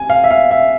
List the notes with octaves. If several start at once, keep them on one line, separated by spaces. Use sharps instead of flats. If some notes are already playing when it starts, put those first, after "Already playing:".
Already playing: C3 G#5
F5
E5
F5
E5